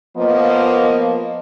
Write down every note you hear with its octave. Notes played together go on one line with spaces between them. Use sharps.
F3 A#3 B3 D#5